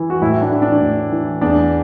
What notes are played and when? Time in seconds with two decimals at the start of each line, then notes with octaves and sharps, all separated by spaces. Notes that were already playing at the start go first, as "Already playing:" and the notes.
Already playing: E3
0.10 F#4
0.21 A2 E4
0.42 D4
0.52 E3
0.62 D4
0.81 A2
1.12 E3
1.41 E2 D4